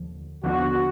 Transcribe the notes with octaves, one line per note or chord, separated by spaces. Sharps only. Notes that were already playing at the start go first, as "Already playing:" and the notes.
Already playing: D#2 D3 F3
D#2 D3 F3 B3 D4 F#4